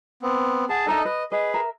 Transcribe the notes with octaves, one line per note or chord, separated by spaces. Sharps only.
B3 C4
G#4 F#5 A5
D4 D#4 A4 A#4 D#5 E5
B4 D#5
G#4 B4 D#5
A#4 E5